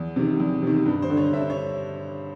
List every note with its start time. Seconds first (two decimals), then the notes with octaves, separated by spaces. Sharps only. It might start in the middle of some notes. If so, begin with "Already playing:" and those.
Already playing: E2
0.16 C3 D#3
0.40 E2
0.62 C3 D#3
0.86 G2
1.02 C5
1.10 D3
1.17 C#5
1.33 G2 E5
1.50 C#5